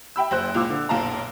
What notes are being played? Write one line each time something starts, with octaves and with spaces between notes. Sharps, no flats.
E5 G5 B5 E6
F#1 C5 F#6
C#2 A#2 F4 D6 E6
D3
F#1 B1 A#2 F5 A5 A#5